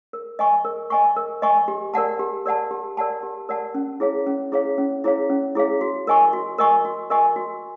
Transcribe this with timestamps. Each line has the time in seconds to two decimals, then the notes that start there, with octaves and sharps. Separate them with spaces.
0.13 A#4
0.39 D#5 G#5 C#6
0.65 A#4
0.90 D#5 G#5 C#6
1.16 A#4
1.42 D#5 G#5 C#6
1.68 G4
1.94 A#4 D5 F#5 A5
2.19 G4
2.46 A#4 D5 F#5 A5
2.71 G4
2.97 A#4 D5 F#5 A5
3.23 G4
3.49 A#4 D5 F#5 A5
3.74 C#4
4.00 E4 G#4 C#5 F5
4.27 C#4
4.52 E4 G#4 C#5 F5
4.78 C#4
5.04 E4 G#4 C#5 F5
5.30 C#4
5.55 E4 G#4 C#5 F5
5.81 F#4
6.07 A#4 D#5 G#5 C#6
6.33 F#4
6.58 A#4 D#5 G#5 C#6
6.85 F#4
7.10 A#4 D#5 G#5 C#6
7.36 F#4